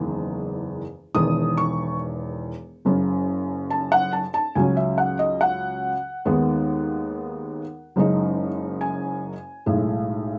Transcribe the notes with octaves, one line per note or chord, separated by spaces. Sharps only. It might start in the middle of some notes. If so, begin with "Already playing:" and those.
Already playing: F#1 E2 D#3 G#3
E1 E2 D#3 D#6
C#6
F#1 F#2 C#3
A5
F#5
A5
A5
C#2 C#3 F#3 C#4 G#5
E5
F#5
D#5
F#5
D#2 D#3 G#3 B3
F#1 F#2 C#3 G#3 D#4
G#5
B1 A2 G#3